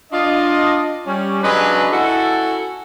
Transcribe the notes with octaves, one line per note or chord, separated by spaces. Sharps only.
D4 F4 D#5
G3 C#4
C#3 F#3 G#3 C#4 D4 B4
C#4 E4 F#4 A4